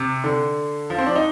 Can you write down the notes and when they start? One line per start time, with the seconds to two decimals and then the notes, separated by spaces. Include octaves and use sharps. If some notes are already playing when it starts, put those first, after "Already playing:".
Already playing: C3
0.24 D3
0.90 F3
0.98 C4
1.07 D4
1.16 D#4